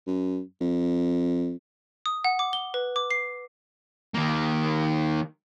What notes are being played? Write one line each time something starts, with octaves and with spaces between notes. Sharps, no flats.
F#2
F2
D#6
F#5
D6
G7
B4
D6
C7
D#3 A#3